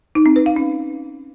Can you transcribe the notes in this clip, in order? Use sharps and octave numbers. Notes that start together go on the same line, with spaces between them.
D#4
C4
B4
F5
C#4